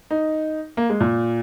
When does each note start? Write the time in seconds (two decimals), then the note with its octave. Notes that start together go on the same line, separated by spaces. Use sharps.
0.11 D#4
0.77 A#3
0.90 G#3
1.01 A#2